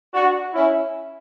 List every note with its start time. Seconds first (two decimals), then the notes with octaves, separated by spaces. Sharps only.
0.14 D4 F#4
0.54 C#4 E4